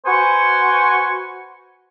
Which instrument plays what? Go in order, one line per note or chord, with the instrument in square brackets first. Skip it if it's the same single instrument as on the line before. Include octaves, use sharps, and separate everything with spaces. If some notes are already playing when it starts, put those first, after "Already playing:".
[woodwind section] F#4 B4 C5 G#5 C#6